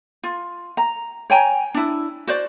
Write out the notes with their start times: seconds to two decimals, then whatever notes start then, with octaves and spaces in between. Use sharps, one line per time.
0.24 F4
0.77 A#5
1.30 C#5 G5 G#5 A#5
1.74 D4 E4
2.27 F#4 C5 D5